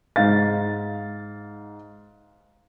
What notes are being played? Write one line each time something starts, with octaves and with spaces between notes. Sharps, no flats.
G#2 F5 A6